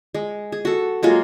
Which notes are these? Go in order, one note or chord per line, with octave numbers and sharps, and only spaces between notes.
G#3
G#4
F#4 A4
F#3 G#3 A#3 F4